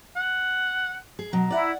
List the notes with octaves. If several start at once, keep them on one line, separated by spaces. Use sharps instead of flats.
F#5
G#4
B2 F#3 A#5
E4 D5 F#5